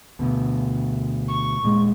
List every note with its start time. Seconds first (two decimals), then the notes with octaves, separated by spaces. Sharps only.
0.19 D2 B2
1.28 C#6
1.63 D#1 A#2 G#3